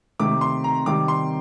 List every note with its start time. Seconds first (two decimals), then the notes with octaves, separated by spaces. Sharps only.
0.19 C3 D#3 A3 D6
0.41 C6
0.64 A#5
0.86 C3 D#3 G3 D6
1.08 C6